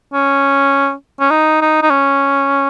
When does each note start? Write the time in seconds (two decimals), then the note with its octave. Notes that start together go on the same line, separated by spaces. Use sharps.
0.13 C#4
1.20 C#4
1.31 D#4
1.61 D#4
1.82 D#4
1.90 C#4